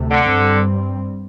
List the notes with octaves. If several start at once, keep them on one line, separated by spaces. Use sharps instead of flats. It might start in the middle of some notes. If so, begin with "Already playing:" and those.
Already playing: D2 C3 A3
D3
G2 G3 C4